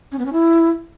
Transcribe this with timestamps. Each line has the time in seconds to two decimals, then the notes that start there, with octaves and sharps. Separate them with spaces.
0.12 C#4
0.19 B3
0.26 C#4
0.33 E4